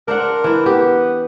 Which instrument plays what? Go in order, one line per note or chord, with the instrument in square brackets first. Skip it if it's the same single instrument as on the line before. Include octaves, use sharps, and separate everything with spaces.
[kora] D4 C5 F#5 [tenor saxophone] A#4
[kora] E3 E4
[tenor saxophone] B3 [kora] G4